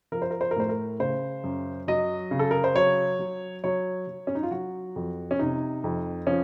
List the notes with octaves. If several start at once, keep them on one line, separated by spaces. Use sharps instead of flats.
F3 A#4
C5
A#4
C5
A#4
A2 C5
A#4
C#3 C5
F#2
F#3 D#5
C#3
A4
A#4
C5
F#3 C#5
F#3
F#3 C#5
F#3
C#4
D#4
F4
F#3 F#4
F2
C#4
C3 D#4
F2
F3 C#4